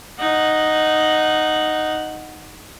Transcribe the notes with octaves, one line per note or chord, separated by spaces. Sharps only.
D#4 F#5